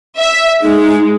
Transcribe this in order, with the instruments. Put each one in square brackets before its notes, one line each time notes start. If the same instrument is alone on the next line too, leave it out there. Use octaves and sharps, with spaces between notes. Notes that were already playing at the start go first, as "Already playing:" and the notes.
[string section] E5
[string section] G#3 [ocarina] D#4